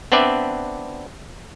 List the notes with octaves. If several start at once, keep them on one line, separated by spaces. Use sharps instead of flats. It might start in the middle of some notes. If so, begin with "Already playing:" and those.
B3 C4 D4 B4 D5 E5